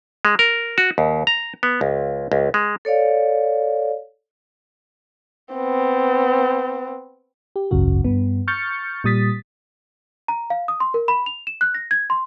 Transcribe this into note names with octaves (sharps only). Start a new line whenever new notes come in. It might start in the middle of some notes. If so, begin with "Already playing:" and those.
G#3
A#4
F#4
D#2
A#5
B3
C#2
C#2
G#3
A4 C#5 D5 F5
B3 C4
G4
G#1 C#2 F#2 C#3 F#4
G2 B3
C#6 F6 G6 A6 C#7
A#2 G3 D#6 A6 B6
A#5
F5
D#6
C6
A#4
B5
F7
E7
F#6
A#6
G#6
C6